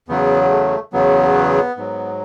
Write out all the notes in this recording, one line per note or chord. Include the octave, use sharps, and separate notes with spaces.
E2 C#3 F#3 B3
A3
E2 C#3 F#3 B3
G#2 F#3